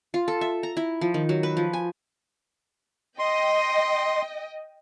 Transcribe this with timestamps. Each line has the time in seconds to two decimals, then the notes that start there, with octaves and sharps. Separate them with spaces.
0.14 F4
0.28 A4
0.41 E5
0.63 A#5
0.77 E4
1.01 F3
1.14 D#3
1.29 F#3
1.43 B4
1.57 F3
1.73 G#5
3.19 D#5 G5 C6